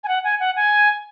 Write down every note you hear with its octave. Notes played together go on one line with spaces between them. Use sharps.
G#5
F#5
G#5
F#5
G#5